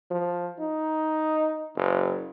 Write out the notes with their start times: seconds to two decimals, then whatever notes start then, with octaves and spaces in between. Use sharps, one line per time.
0.11 F3
0.60 D#4
1.76 F#1